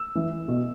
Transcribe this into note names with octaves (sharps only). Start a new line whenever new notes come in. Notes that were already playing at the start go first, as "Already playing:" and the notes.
Already playing: E6
E3
B2